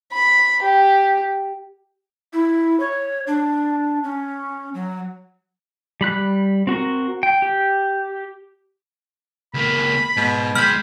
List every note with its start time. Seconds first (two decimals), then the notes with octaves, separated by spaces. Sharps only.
0.13 B5
0.62 G4
2.33 E4
2.80 C#5
3.27 D4
4.04 C#4
4.74 F#3
6.01 G3 B5 F#6
6.67 C4 F#4 A#4
7.23 G5
7.42 G4
9.54 C#2 A#3 B5
10.17 G#2 B2
10.55 D#2 G#3 B5 F6 G6